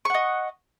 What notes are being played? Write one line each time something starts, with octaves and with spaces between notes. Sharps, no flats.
D#5 F#5 C#6